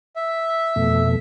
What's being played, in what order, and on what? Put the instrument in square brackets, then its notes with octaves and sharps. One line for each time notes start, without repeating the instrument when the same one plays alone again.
[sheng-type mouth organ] E5
[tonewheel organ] F2 B2 A3